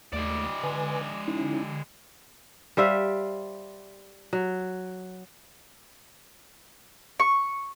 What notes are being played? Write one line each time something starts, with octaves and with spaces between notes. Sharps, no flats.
D#2 G#3 A3 D5
D3 B4 G#5
D6
D3 C#4 D#4 E4
G3 C5 E5 F5
F#3
C#6